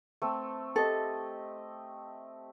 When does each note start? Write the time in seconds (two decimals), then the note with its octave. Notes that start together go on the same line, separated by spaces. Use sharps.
0.22 A3 C4
0.76 G4 A4 D#5